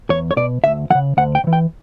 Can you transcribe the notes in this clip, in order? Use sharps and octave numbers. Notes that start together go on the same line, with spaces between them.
E2 C#5
C#5
B2 D5
D2 E5
E3 F#5
C#3
D2 F#5
G5
C#3
E3
G5